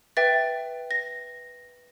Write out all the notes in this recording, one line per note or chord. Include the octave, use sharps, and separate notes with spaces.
B4 E5 G5 A6
A#6